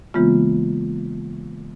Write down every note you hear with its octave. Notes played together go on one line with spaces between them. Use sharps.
C#3 E3 G#3 A#3 B3 F4